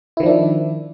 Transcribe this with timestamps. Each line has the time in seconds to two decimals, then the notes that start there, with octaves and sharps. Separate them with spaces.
0.17 E4
0.20 D#3
0.23 F3
0.26 D4